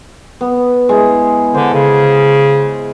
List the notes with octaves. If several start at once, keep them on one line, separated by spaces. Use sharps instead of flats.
B3
G#3 E4
D3 C5
C#3